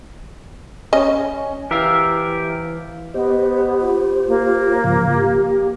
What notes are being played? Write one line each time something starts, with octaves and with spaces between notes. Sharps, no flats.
C#4 D#5
E3 G4 A#4 E5 F5
B3 G4 C5 D#5
F4
A#3
G#2 C#3 F3
G4